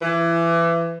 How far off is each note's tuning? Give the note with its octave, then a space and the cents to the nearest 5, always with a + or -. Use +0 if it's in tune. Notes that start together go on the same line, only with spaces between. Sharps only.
E3 +25